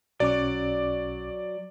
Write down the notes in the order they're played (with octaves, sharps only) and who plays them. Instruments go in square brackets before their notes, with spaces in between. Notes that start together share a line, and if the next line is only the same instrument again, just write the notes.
[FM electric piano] B1 C#4 D6 [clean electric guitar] F#3 [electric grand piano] D5